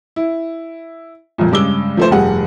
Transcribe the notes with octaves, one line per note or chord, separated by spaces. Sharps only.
E4
F2 A#2
G2 C#3 G#3 D6 E6 G7
F3 A3 C5
F1 G2 G4 G#4 F#5